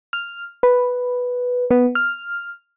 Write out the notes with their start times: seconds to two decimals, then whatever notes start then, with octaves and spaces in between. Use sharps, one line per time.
0.13 F6
0.63 B4
1.71 B3
1.95 F6